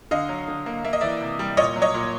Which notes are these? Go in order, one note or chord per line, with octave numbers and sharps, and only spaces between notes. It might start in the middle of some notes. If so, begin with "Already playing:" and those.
D3 D#5 F5
F#3
D3
A#3
A#3 E5
D#5
E3 D5 E5
C3
G3
A#2 C#5 D#5
F#3
C#5 D#5
A#2